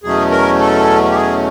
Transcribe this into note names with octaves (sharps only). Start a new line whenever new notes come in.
E2 B2 F#3 A3 C#4 G#4
A#4
A4
G4
G#4